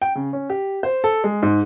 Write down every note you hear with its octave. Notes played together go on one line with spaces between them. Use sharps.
G5
C#3
C#4
G4
C5
A4
G#3
G#2